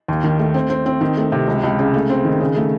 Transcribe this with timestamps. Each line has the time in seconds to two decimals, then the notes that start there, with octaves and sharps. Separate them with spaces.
0.08 D#2
0.24 D#3
0.39 A3
0.54 C4
0.70 C4
0.86 C4
1.01 D#3
1.17 A3
1.32 C3
1.48 C#2
1.63 C#2
1.79 C#3
1.94 A3
2.10 C4
2.25 D#3
2.40 C#3
2.56 A3